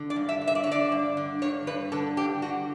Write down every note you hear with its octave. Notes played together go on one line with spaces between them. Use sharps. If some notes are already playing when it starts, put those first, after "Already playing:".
Already playing: D3
D5
G2
E5
D3
E5
D5
C#5
D3 D5
G2
D3
G2 C#5
G2 B4
D3 A4
G2 G4
D3 F#4